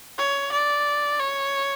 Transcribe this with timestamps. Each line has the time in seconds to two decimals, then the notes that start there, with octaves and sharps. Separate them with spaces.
0.18 C#5
0.52 D5
1.20 C#5